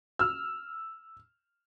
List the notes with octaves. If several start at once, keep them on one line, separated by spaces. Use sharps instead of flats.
E6 F6